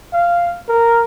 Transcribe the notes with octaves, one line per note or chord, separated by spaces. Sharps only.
F5
A#4